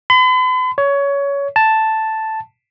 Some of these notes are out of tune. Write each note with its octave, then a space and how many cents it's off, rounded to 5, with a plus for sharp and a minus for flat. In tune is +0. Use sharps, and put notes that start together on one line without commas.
B5 +45
C#5 +20
A5 +0